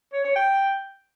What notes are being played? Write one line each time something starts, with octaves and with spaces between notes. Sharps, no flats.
C#5
C#5
G5